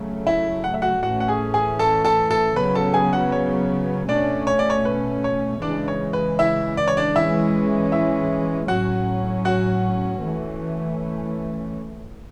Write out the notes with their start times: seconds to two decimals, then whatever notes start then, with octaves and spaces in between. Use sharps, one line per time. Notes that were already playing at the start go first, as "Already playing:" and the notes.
Already playing: C#3 F#3 A3
0.27 E4 E5
0.64 F#5
0.74 E5
0.82 F#4 F#5
1.03 A2 E3 A3 C#4 F#4 F#5
1.20 F#5
1.28 G#4 G#5
1.54 G#4 G#5
1.79 A4 A5
2.05 A4 A5
2.31 A4 A5
2.56 C#3 F#3 B3 B4 B5
2.75 A4 A5
2.94 G#4 G#5
3.13 F#4 F#5
3.32 C#5
4.09 B2 A3 C#4 D4 D5
4.47 C#5
4.59 D5
4.70 C#5
4.85 B4
5.24 C#5
5.62 C#3 E3 G#3 D4 D5
5.88 C#5
6.13 B4
6.39 E4 E5
6.77 D5
6.88 C#5
6.97 D4 D5
7.15 E3 G#3 C#4 E4 E5
7.92 E4 E5
8.68 A2 F#3 C#4 F#4 F#5
9.45 F#4 F#5
10.22 E3 A3 C#4